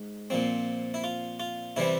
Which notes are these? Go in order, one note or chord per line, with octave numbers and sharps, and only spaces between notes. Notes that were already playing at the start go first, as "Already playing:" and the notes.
Already playing: G#2
A#2 F3 C4
E4
F4
F4
C3 E3 G3 C4 E4